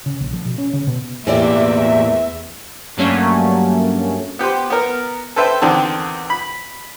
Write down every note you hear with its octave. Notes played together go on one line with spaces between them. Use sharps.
C#3
A#1
F3
B2
C#4
C#3
B2
E2 A2 E3 A#3 G4 D5 E5
G2 F#3 A3 A#3 C#4
B3 G4 B4 C5
B3 A#4
A4 B4 C5 E5 G5
E2 D3 D#3 C4 G5 A5
B5